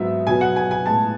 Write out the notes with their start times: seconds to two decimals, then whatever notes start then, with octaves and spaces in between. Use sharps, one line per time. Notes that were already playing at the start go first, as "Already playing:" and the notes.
Already playing: G#2 F#3 B3 D#4 E5
0.27 B2 F#3 B3 G#5
0.41 F#5
0.56 G#5
0.71 G#5
0.86 A2 G#3 B3 A5